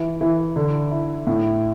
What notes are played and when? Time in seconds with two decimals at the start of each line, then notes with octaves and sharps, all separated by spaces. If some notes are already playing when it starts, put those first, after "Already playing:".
Already playing: E3
0.21 E3
0.56 D3
0.91 E4
1.27 A2